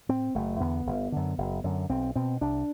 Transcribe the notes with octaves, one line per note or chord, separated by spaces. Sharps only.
A2 C4
F#1 A3
E2 D3 B3
G1
F#2 D3
F#1
F#2 D3
B1 C4
B2 C4
C2 D4